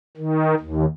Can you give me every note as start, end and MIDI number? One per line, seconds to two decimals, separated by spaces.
0.17 0.55 51
0.60 0.86 39